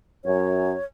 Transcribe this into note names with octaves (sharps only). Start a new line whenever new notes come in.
F#2 C#5